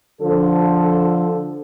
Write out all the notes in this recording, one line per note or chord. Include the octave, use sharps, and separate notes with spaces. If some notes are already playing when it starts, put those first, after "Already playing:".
D3 F3 A4